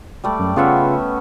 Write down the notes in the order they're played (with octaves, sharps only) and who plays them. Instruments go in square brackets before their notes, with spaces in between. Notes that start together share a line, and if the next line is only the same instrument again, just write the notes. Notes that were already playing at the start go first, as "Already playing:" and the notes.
[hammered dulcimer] G3 A3 D5
[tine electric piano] F#2
[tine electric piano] C#3 F4 F#5 [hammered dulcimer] B3 C#4 E5